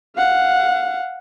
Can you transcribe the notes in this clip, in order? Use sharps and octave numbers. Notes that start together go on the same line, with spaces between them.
F5 F#5